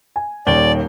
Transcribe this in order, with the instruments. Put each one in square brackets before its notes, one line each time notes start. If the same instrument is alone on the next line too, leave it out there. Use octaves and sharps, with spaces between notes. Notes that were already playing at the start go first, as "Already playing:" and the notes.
[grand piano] G#5
[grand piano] D#1 D#2 G7 [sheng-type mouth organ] D5